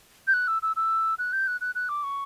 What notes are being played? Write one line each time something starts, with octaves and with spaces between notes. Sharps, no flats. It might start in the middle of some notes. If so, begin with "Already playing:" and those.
G6
F#6
E6
E6
E6
F#6
G6
F#6
F#6
F#6
D6
C#6